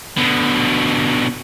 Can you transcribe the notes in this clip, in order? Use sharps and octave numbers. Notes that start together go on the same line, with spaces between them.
B2 D3